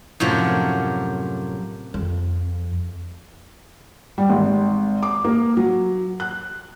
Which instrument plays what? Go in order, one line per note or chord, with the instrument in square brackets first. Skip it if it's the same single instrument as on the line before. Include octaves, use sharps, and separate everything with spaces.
[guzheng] F#2 A2 C3 F3 F#3
[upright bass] F2
[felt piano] G3
G#1
D6
A#3
F#3
F#6